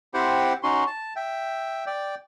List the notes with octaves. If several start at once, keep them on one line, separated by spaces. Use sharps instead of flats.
C4 E4 G4 C5 F#5 G5
C#4 D#4 F#4 C6
A5
E5 G5
D5 G5